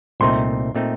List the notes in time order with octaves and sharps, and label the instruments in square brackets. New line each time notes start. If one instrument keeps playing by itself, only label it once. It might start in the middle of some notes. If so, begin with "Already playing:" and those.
[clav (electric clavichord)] C2 A#2 A3 C4 D#4 [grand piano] C6
[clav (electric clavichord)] A#2 A3 C4 D#4